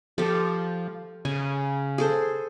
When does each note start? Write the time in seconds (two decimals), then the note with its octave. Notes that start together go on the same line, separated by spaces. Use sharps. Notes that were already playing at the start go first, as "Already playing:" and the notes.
0.18 F3 G4 A4
1.25 C#3 G#5
1.98 G#4 A4 C5